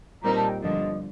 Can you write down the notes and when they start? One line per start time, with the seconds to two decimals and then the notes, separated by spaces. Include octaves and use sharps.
0.23 A#2 G3 C4 D#4 A#4 A#5
0.35 A5
0.49 G5
0.62 G1 G2 D3 F3 D#5